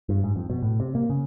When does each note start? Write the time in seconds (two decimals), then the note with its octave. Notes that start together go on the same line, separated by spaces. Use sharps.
0.09 G2
0.24 G#2
0.36 F2
0.50 B2
0.62 A2
0.80 C3
0.95 A#3
1.10 C#3